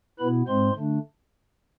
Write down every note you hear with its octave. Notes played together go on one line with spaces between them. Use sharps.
B2 B3 E4 B4 B5
G#2 G#3 C4 C5 C6
D3 A3 D4